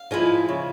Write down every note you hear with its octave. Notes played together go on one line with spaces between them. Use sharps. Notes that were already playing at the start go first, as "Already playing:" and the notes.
Already playing: F5
F3 G#3 E4
C#3